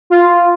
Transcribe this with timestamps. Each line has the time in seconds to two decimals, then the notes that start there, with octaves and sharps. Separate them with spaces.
0.10 F4